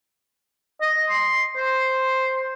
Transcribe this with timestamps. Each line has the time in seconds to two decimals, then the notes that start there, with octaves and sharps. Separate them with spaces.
0.81 D#5
1.10 C6
1.57 C5